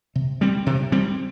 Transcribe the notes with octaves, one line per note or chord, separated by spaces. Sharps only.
C3
G3 C4
C3
G3 C4